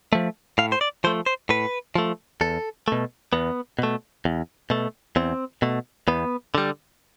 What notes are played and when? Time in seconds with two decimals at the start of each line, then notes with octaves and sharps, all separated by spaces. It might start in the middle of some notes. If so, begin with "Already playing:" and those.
0.13 F3 A3
0.58 A2 F5
0.72 C5
0.81 D5
1.04 F3 A3 C5
1.26 C5
1.49 A2 B4
1.95 F3 A3
2.41 E2 A4
2.88 B2 A3
3.33 E2 B3
3.79 B2 A3
4.25 E2
4.70 B2 A3
5.16 E2 C4
5.62 B2 A3
6.08 E2 B3
6.55 D3 G3